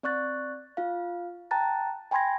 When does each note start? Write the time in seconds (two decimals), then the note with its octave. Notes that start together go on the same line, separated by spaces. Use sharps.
0.03 C4 D5 C#6 F#6 A6
0.77 F4 F5
1.51 G5 A5 A#5 F#6 A6
2.11 G5 G#5 B5 C6 G#6 A#6